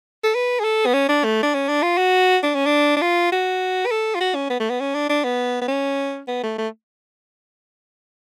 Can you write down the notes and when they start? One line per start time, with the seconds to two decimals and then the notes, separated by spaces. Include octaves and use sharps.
0.24 A4
0.35 B4
0.60 G#4
0.64 A4
0.86 B3
0.94 C#4
1.09 D4
1.24 A3
1.43 D4
1.54 C#4
1.68 D4
1.83 F4
1.98 F#4
2.43 D4
2.55 C#4
2.66 D4
2.97 D4
3.02 F4
3.32 F#4
3.86 B4
3.91 A4
4.15 F4
4.20 F#4
4.35 C#4
4.50 B3
4.60 A3
4.70 B3
4.80 C#4
4.94 D4
5.09 D4
5.24 B3
5.62 B3
5.68 C#4
6.28 B3
6.43 A3
6.58 A3